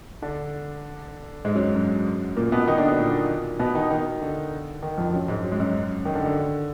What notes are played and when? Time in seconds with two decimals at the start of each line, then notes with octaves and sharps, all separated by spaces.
0.22 D3 D4
1.45 G#2 G#3
1.55 F#2 F#3
1.75 F#2 F#3
2.36 A#2 A#3
2.52 B2 B3
2.68 D#3 D#4
2.78 D3 D4
2.88 B2 B3
2.99 A#2 A#3
3.60 B2 B3
3.75 D#3 D#4
3.91 D#3 D#4
4.22 D3
4.82 D#3
4.98 F2 F3
5.13 F#2 F#3
5.28 G#2 G#3
5.44 F#3
5.52 G#3
5.60 F#2 F#3
6.05 D#3
6.15 D3
6.26 D3